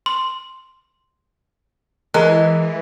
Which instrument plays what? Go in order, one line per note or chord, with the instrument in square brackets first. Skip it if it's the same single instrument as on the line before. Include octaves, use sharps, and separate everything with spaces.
[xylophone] C6
[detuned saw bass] E3 [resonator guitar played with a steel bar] G#3 [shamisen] A#4 [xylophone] F#6